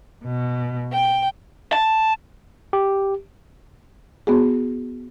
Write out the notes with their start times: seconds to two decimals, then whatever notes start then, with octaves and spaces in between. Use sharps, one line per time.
0.24 B2
0.92 G5
1.73 A5
2.73 G4
4.27 B3 F#4 G#4